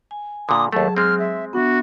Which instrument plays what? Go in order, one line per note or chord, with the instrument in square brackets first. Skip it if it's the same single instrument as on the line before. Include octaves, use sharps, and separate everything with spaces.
[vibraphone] G#5
[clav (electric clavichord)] A#2 D3 [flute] D#6
[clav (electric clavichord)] D#2 A3 [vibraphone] F#3 G#4 [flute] A5
[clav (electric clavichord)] G#3 C4 [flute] F6
[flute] E5
[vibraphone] B3 D4 E5 [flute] F#4